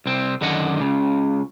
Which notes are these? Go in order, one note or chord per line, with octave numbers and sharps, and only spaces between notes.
C2 C4
F#2 D3 D#3 D#5 F#5
C#2 C#3